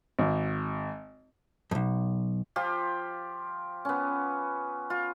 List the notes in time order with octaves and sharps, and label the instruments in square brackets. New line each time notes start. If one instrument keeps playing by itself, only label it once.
[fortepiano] G#1
[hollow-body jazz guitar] B1 F2
[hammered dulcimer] F3 F4 G4
B3 C#4
F4